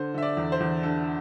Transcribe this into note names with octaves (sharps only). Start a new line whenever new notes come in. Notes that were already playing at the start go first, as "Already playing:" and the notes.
Already playing: D3 C5
D3 E5
D5
E2
C5
E2
D3 A4